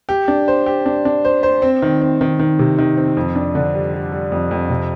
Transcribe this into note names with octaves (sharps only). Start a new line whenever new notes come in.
G4
D4
C5
G4
D4
D4
C5
C5
C4
D#3
C4
D#3
D#3
C3
D#3
C4
F2
D4
D3
G3
G3
G3
F2
F2
C3